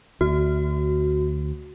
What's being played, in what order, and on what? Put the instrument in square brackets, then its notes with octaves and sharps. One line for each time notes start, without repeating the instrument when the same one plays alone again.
[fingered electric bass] D2 [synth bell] F#4